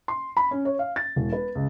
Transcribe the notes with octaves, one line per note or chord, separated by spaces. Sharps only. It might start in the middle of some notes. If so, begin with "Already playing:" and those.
C6
B5
C#4
C#5
F5
A6
E1
B4
C#2